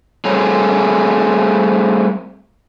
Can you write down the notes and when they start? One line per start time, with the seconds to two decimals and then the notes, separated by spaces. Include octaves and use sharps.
0.25 G3 A3 C4 G#4 A#4 C#5